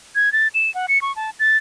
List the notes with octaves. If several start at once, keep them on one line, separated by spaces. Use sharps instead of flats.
G#6
A6
E7
F#5
C#7
C#6
A5
A6